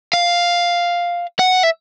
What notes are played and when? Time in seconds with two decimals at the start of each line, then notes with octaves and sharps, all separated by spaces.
0.13 F5
1.39 F#5
1.63 E5